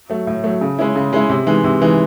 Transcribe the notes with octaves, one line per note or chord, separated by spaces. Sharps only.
F#3 A3
A2
F#3 A3
C#3
G#3 C#4 E4
C#3
G#3 C#4 E4
C3
E3 G#3 D#4
C3
E3 G#3 D#4